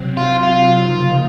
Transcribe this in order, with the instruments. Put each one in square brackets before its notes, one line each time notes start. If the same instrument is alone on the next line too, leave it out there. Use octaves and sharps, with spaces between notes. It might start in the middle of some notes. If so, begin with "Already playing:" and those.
Already playing: [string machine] C3 F#3 C4
[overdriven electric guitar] F4
F4
[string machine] F#2 C#3 F3 A#3 D#4